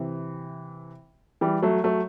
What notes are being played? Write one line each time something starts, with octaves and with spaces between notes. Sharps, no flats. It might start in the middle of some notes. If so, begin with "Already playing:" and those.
Already playing: C3 E3
E3 G3
F#3 A3
F#3 A3